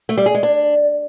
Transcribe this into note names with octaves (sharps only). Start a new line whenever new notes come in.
A3
G3
G#4
G#3
D4